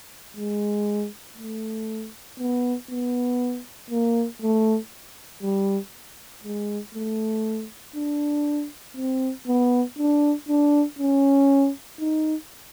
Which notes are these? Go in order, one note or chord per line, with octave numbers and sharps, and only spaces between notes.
G#3
A3
B3
B3
A#3
A3
G3
G#3
A3
D4
C4
B3
D4
D4
C#4
D#4